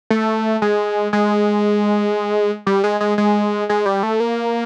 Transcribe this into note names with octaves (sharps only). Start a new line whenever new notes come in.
A3
G#3
G#3
G3
G#3
G#3
G#3
G#3
G3
A3
A#3